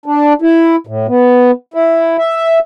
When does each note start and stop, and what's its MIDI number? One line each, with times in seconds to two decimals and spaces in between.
0.06 0.33 62
0.42 0.76 64
0.87 1.07 45
1.08 1.51 59
1.74 2.17 64
2.18 2.59 76